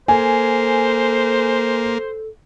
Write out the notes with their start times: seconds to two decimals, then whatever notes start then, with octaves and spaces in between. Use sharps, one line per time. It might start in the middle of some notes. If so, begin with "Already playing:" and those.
0.08 A#3 A4 C5 G#5